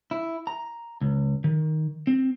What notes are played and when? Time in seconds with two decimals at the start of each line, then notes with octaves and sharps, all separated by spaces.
0.11 E4
0.47 A#5
1.01 C#2
1.44 D#3
2.07 C4